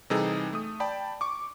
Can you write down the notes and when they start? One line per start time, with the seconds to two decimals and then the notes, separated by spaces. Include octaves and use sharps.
0.10 C3 E3 G3 D#4 G#4 A4
0.53 A3 D#6
0.80 D5 G5 A5 B5
1.21 C#6 D6